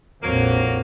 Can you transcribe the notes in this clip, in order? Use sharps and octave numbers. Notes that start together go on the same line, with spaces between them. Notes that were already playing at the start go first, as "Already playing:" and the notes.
A#1 F2 F#3 A#3